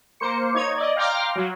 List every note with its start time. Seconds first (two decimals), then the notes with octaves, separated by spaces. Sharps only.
0.20 A#3 C5 C#7
0.55 D#4 C#5 G#6
0.76 D5 D#5
0.96 F5 G5 A#5 C6 D6 F6
1.36 F#3